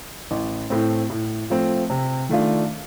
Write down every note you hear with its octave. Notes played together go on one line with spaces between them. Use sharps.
A1
A2 A3 C4
A2
F3 A3 C4
C3
D#3 A3 D4 F4